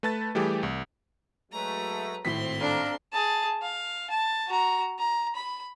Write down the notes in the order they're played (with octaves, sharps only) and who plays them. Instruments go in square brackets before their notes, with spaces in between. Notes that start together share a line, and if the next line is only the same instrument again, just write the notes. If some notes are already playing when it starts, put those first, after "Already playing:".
[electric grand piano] A3 B4 A5 B5 A6
E3 G3 A3 G4 G#4
C2
[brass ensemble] F#3 G#3 A3 [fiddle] B4 A#5
[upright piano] G#1 A2 B6 [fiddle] C4 C6
[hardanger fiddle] D4 [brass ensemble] A4 F5 A#5
[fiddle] G#4 A5
F5
A5
F#4 A#5
A#5
B5